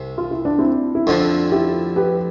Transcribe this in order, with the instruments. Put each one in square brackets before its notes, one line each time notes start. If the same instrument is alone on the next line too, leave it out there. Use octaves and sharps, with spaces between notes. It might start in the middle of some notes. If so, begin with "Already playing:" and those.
Already playing: [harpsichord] C2 C3
[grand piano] F4
E4
D4
C4 E4
E4
[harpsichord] F2 D3 F3 [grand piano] D4 F4
[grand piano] E4 G4
G4 B4